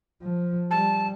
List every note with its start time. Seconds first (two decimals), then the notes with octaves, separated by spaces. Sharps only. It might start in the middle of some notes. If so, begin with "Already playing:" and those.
0.22 F3
0.71 G3 A5